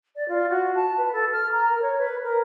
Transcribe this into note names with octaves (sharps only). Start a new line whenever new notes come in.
D5
F4
F#4
A5
B4
A4
F6
A#5
A#4
C#5
B4
A#4